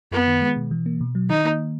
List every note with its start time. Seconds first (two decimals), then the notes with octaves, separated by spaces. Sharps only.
0.12 F#2 B3
0.27 D#3
0.42 G#3
0.56 B2
0.71 E3
0.86 A#3
1.01 B2
1.15 F#3
1.29 D#3 D#4
1.45 A#3